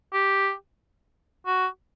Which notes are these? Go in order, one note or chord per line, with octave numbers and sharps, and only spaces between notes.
G4
F#4